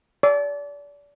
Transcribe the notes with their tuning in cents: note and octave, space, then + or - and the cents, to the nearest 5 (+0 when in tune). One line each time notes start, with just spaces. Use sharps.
D5 -30